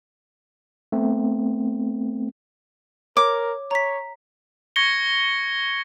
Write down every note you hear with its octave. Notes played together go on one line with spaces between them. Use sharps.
A3 B3 C4
A#4 C#5 D6
C#5 A#5 B6
C#6 G#6 A#6 C#7 G7